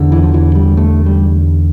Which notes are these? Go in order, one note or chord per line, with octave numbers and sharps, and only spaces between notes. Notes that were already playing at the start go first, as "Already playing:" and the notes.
Already playing: E2 D3
E3
F3
E3
G3
A3
G3